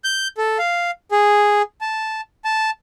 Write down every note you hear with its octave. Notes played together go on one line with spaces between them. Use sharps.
G6
A4
F5
G#4
A5
A5